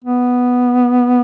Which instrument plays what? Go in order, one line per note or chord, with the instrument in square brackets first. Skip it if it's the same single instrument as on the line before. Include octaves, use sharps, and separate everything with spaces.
[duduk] B3